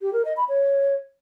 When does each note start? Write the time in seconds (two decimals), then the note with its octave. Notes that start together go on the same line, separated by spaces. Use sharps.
0.01 G4
0.13 A#4
0.25 D#5
0.37 B5
0.49 C#5